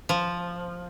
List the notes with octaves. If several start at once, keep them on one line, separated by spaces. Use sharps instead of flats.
F3